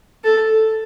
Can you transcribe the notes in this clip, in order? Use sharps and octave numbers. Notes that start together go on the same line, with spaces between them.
A4